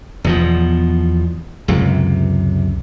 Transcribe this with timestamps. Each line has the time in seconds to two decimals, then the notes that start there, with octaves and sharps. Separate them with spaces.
0.24 E2 B2 F3
1.68 C#2 F#2 C3